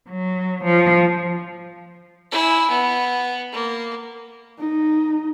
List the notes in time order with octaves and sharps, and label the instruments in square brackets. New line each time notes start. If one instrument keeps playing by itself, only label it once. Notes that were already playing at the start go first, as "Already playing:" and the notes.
[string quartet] F#3
F3
[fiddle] E4 G#5
B3
A#3
[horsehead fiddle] D#4